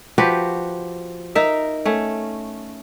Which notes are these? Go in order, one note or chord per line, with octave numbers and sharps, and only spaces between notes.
F3 F#4 G4 B4
D#4 A#4 E5
A3 C#4